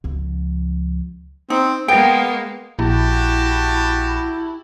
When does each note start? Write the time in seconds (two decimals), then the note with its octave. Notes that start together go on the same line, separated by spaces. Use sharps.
0.04 C#2 F3
1.50 C4 D#4
1.88 G#3 A#3 B3 G5
2.79 A#1 E4 F#4 G4 A5